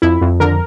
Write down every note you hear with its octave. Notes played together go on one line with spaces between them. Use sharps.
F2 E4
F2
D3 A#4